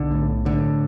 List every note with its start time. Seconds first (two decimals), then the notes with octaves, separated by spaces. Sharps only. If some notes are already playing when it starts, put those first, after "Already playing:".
Already playing: B1 D3
0.11 A2
0.45 A2 D3